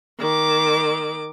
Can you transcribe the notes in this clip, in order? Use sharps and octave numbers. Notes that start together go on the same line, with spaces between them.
D#3 D6